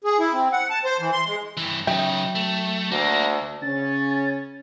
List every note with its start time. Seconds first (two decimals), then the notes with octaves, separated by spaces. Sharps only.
0.04 G#4
0.19 E4
0.33 C4
0.52 F#5
0.70 A5
0.85 C5
1.00 E3
1.12 C6
1.26 G#3
1.57 G2 E3
1.87 C#3 F#3 D#4 E5 G5
2.35 A3
2.91 D2 A#3
3.62 C#3 C#4 A6